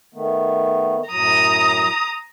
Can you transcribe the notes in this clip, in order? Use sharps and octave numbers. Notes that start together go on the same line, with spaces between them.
D#3 A3 B3
F#2 A2 F#3 A#5 D#6